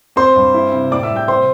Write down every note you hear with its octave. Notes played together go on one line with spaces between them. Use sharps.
C4 C5 C6
G2
E4
C3
A2 D5 D6
E5 E6
G3
G5 G6
C3 C5 C6